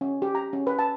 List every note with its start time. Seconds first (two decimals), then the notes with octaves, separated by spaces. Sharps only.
0.01 C#4
0.22 G4
0.35 A#5
0.53 C#4
0.67 B4
0.79 A5